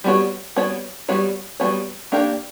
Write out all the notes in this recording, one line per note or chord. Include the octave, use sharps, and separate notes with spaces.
G3 B3 F#4 C#5
G3 B3 F#4 C#5
G3 B3 F#4 C#5
G3 B3 F#4 C#5
A#3 D4 G4 A#4